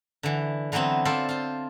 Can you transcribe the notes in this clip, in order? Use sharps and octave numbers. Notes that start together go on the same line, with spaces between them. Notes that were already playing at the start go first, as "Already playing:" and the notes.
D3 E3
D3 E3 F#3 B3 C4
F4 A4 C5 D5 E5
F4 C5